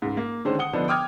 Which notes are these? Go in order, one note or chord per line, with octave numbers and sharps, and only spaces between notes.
C#2 G#2
A#3
D3 D#3 G#3 C#4 C5
F#5 D#6 C#7 G7
D3 F3 B3 D4 D#4
G5 D6 D#6 F6 G#6